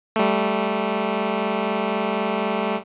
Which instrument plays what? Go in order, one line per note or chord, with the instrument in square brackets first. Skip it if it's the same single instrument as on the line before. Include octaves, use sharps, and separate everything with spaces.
[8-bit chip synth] G3 A3